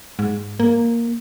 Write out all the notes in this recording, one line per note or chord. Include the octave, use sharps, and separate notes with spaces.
G#2
A#3